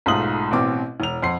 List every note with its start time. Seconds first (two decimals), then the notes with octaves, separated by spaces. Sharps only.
0.06 B1 G#2 A3 F4 D#6 F#7
0.51 A1 B2 C4 D6
1.00 E1 F7
1.22 F2 F#5 C6 C7